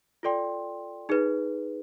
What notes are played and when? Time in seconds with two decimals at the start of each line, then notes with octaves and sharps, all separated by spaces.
0.23 F4 A4 D5 G5 C6
1.09 D#4 G#4 B4